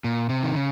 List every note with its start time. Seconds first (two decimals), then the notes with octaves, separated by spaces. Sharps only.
0.04 A#2
0.29 C3
0.43 D#3
0.55 C#3